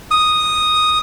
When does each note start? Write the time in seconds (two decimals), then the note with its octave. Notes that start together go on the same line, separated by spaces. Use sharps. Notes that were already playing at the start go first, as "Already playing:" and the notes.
0.11 D#6